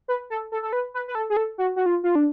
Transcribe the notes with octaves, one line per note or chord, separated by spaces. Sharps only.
B4
A4
A4
A4
B4
B4
B4
A4
G#4
A4
F#4
F#4
F4
F4
D4